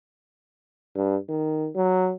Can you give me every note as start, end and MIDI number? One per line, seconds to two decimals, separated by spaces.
0.96 1.16 43
1.29 1.69 51
1.75 2.13 54